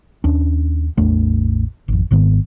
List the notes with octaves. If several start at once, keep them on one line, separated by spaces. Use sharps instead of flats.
D#2 C#4 D4
A1 E2 A3 D4
G#1 F2
G#1 G#2 D#3 B3